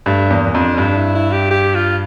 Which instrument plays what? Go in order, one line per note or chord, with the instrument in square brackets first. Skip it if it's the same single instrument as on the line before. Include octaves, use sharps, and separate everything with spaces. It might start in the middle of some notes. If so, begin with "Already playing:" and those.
[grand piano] G2 [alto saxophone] A3
[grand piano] E2 [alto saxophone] A#3
[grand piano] E2
[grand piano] F2 [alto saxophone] D4
[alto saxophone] C#4
[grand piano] G2 [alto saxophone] D4
[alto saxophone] E4
E4
G4
G4
F4